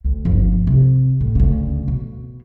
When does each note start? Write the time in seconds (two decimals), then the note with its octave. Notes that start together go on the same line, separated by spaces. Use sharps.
0.04 D2
0.25 G1 F3
0.67 C3
1.21 A2
1.35 D2 C#3
1.88 B2